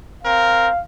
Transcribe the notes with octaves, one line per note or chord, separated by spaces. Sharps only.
C4 A#4 F5